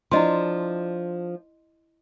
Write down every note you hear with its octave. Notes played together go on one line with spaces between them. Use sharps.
F3 D4 E4 D#5 C6